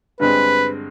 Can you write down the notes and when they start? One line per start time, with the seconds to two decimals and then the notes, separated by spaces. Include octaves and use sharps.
0.20 G2 D3 G#3 C4 B4